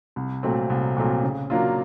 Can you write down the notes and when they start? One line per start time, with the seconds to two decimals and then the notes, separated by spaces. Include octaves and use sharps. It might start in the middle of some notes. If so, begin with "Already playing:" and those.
0.16 C2
0.43 A#2 F#3 A3 C4
0.70 C2
0.97 A#2 F#3 A3 C4
1.23 C#3
1.50 F#3 A#3 D4 F4